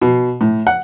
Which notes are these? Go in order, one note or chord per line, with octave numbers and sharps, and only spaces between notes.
B2
A2
F#5